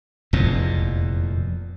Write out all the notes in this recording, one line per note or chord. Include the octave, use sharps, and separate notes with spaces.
F1 E2 A#2